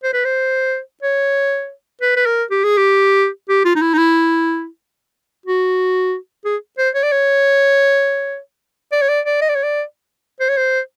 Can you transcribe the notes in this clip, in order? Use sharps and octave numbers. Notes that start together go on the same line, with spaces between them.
C5
B4
C5
C#5
B4
B4
A#4
G4
G#4
G4
G4
F4
D#4
E4
D#4
E4
F#4
G#4
C5
C#5
D5
C#5
D5
C#5
D5
D5
D#5
D5
C#5
D5
C5
C#5
C5